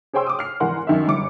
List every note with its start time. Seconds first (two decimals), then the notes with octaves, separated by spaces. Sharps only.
0.14 G#4 C5 C#5 G5 C6 E6
0.27 D6 D#6
0.39 F6 C7
0.60 G#1 E3 A#4 F#5 C6
0.87 F#2 D#3 E5
1.07 G1 D6 C#7